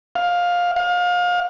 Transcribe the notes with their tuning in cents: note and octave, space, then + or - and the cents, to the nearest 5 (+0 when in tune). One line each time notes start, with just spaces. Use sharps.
F5 +15
F5 +30